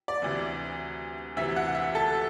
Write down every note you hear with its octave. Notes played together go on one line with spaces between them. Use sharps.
D5
D2 C3 E3
D2 C3 E3 E5
F#5
E5
A4